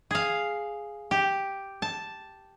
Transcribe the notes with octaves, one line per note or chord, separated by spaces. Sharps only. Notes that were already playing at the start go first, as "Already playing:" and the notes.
G#4 F5
G4
A5